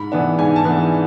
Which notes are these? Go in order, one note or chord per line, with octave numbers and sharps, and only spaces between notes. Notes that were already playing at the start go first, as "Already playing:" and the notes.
Already playing: G#2 B5
E3 B3 D4
G#2 G#5
A5
E3 B3 D4